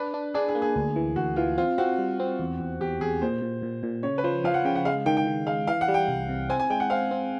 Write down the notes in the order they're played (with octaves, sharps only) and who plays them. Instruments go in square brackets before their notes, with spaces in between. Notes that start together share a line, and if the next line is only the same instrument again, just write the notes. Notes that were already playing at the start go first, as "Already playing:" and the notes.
Already playing: [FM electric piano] D4 [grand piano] B4
[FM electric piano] D4
[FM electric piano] D4 [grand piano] G#4
[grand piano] G#4
[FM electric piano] A#3
[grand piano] G#4
[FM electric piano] D2
E3
[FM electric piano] D2 [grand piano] F#4
[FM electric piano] E3 [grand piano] F4
[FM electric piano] C4 [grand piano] F4
[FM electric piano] C4 [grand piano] F#4
[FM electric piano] G3
C4
E2
E2
[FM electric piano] E2 [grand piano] G4
[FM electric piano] E2 [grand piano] G#4
[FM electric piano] A#2 [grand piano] C5
[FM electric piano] A#2
A#2
A#2
[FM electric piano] C#3 [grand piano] C#5
[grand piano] B4
[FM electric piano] F3 [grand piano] C5
[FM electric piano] F3 [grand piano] F5
[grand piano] F#5
[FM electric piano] C#3 [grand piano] G5
[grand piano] F#5
[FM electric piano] G#3 [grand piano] F5
[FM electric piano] D#3 [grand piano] G5
[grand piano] G5
[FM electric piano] D#3
[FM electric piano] G#3 [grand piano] F5
[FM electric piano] E3 [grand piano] F5
[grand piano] F#5
[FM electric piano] G3
[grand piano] G5
[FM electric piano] C2
C3
[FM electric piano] C4 [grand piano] G#5
[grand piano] G#5
[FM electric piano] G#3 [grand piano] G5
[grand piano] F#5
[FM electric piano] C4 [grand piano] F5
[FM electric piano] C4